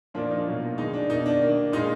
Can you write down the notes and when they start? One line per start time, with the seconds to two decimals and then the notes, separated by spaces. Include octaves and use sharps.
0.14 A#2 F3 A#3 D4
0.31 D#4
0.46 B2 F#3 A#3
0.78 D#3 G#3 D#4
0.93 D4
1.09 B2 A#3 D#4
1.26 D4
1.41 D#3 A#3
1.72 A#2 G#3 D#4